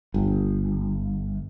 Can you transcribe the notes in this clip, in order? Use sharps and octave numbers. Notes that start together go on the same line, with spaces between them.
G1